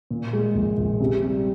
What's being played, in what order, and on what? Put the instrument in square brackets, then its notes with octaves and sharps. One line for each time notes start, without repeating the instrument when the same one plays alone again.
[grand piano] A#2
G#3
A#1
A#1
C3
G3